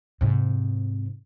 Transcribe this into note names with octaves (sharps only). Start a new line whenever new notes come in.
G#2 C3